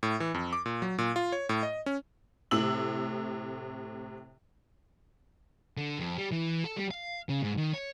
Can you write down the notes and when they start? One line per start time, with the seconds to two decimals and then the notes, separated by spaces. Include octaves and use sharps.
0.03 A2
0.20 E3
0.34 F2
0.53 D6
0.66 A#2
0.82 F#3
0.98 A#2
1.16 F4
1.32 C#5
1.49 A2
1.63 D#5
1.86 C#4
2.51 A2 C3 E6 F#7
5.78 D3
5.99 F2
6.18 G3
6.32 E3
6.64 A4
6.76 G3
6.91 F5
7.29 C#3
7.42 G#2
7.57 D#3
7.73 C#5